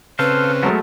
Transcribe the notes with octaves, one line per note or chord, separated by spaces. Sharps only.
C#3 C4 A4 B4 C5 F5
F#3 G#3 A3 B3 A4 A#4